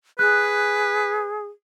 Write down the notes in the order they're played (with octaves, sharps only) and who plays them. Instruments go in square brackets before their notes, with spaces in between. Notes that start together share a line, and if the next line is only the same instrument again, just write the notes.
[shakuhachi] G#4 [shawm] B4 [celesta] F#6